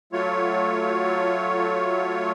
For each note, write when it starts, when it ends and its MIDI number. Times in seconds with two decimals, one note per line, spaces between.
0.13 2.32 54
0.13 2.32 57
0.13 2.32 65
0.13 2.32 73